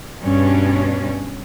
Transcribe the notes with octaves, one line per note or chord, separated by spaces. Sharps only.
G2 B2 C#4 D4